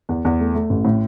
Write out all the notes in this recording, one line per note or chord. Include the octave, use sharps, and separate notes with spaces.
E2
E2
A3
A3
A1
A2